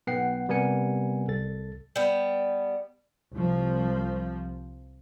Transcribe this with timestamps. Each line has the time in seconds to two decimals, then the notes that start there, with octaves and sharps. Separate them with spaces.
0.07 B1 B3 F#5 G5 C7
0.49 C3 G3 B3 A#4 G#5 C#7
1.28 C2 A4 A6
1.96 G3 B3
3.32 C2 F3